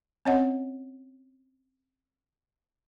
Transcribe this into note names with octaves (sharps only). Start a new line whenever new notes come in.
C4 C#4 C#5 D#5 F#5